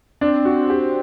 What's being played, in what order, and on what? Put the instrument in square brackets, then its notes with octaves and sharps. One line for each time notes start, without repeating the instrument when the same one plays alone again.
[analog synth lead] C4 [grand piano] D4
[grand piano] F#4
G4